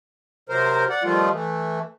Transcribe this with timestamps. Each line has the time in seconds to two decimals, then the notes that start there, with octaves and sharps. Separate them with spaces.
0.49 C3 F#3 A#4 C5
0.90 D5 F#5
1.03 D#3 F3 G3 A3 F4
1.33 E3 A3